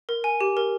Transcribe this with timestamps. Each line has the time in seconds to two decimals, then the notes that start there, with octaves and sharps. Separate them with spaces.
0.09 A#4
0.24 G#5
0.41 G4
0.57 A#4